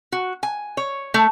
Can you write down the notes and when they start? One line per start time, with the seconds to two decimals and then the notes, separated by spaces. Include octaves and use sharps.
0.12 F#4
0.43 G#5
0.77 C#5
1.14 A3